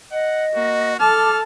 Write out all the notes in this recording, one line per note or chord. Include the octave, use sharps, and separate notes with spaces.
D#5 F#5
A#3 F#4
A4 A5 D6 F6